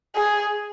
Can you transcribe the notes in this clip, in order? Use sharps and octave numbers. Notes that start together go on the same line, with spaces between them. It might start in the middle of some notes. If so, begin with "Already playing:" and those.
G#4